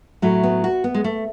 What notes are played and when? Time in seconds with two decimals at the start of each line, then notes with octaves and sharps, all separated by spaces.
0.22 A2 F#3 A3
0.43 B3
0.64 F#4
0.84 B3
0.94 G#3
1.04 A3